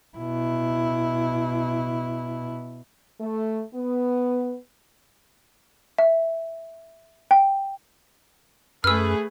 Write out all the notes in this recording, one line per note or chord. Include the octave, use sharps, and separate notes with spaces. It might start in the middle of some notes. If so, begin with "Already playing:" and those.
B2 E4
A3
B3
E5
G5
F#2 A3 G#4 B4 E6 F6